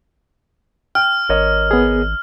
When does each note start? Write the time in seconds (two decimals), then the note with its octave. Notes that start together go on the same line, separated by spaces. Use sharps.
0.95 G5 F6
1.29 G#1 A#4 C#5 D#5
1.71 B3 G#4